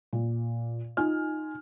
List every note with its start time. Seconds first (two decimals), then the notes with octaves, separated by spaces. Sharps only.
0.13 A#2
0.97 D#4 F4 G#5 F6